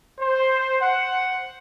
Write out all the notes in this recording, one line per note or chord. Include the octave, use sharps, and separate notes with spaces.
C5
F#5